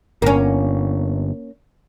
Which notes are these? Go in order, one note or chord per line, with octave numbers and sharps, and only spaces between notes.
G1 A#3 C#4